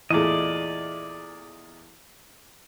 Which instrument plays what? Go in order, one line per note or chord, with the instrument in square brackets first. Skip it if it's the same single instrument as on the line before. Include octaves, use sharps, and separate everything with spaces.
[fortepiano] E2 A#2 A3 [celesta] E4 G#4 [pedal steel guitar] D5 D#5